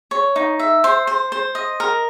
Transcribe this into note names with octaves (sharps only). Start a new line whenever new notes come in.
C#5
D#4
E5
C5
C5
C5
D#5
A#4